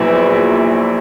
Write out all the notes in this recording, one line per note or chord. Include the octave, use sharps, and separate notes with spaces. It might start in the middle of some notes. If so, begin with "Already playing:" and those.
Already playing: A#1 A#2 F#3 B3 E4